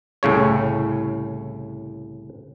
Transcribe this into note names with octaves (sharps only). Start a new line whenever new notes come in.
C2 A2 C#3 C#5